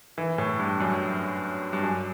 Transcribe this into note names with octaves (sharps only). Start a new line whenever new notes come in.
E3
A2
G2
F#2
G2
F#2